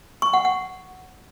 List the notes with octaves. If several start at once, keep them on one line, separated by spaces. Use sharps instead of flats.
C#6
F#5
F#5